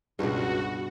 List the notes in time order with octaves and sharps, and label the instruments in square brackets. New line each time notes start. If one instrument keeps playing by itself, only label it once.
[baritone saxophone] C#2 [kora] G2 B2 [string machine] F#4